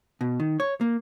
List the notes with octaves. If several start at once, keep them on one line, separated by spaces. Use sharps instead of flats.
B2
D#3
C#5
A#3